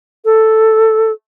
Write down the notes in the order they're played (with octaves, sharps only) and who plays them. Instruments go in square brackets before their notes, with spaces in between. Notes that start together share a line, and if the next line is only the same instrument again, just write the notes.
[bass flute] A4